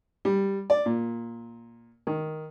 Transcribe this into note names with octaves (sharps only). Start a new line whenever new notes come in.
G3
D5
A#2
D#3